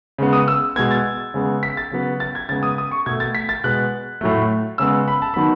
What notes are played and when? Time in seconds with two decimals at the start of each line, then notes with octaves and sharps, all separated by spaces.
0.18 C#3 G#3 B3
0.33 D#6
0.48 E6
0.76 B2 G#3 B3 G#6
0.91 A6
1.34 C#3 G#3 B3
1.63 B6
1.77 A6
1.91 C#3 F#3 B3
2.20 A6
2.35 G#6
2.49 C#3 G#3 B3 A6
2.63 D#6
2.78 D#6
2.91 C#6
3.06 B2 A3 G#6
3.20 A6
3.35 B6
3.49 A6
3.64 B2 G#3 B3 F#6
4.21 A2 F#3 A3
4.78 C#3 G#3 B3 E6
5.08 B5
5.22 A5
5.34 D#3 F#3 B3 B5